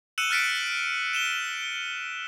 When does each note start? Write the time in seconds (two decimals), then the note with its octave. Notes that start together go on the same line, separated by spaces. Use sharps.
0.18 E6 F#6 C#7 D#7 E7 F#7
0.30 F6 F#6 A6 B6 C#7 D7
1.13 D#7 E7 G7